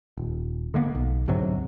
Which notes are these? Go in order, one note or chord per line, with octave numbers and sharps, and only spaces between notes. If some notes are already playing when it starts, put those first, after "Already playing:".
D#1
D3 G#3 A#3 B3
B1
D2 G#2 C3 F#3